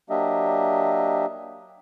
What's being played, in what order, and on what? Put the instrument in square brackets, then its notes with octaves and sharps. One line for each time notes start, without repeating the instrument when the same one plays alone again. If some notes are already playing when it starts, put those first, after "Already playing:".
[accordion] F#3 A#3 D4 G4 D#5 E5